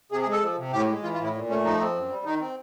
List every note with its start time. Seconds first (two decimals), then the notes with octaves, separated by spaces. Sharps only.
0.12 C3 G#4
0.22 G#4
0.27 G#3 A4
0.42 F3
0.57 C3
0.73 A2 G4
0.88 G#3
1.03 E3 F4
1.14 F4
1.19 A2
1.24 E4
1.34 A#2
1.49 A3 C#4
1.64 F3 D#4
1.80 C4
1.95 F#2
2.10 G3
2.25 D#3 D#4
2.41 C4